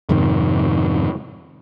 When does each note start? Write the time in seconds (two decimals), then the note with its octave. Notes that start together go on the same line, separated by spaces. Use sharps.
0.09 F2 G#2 C3 D#3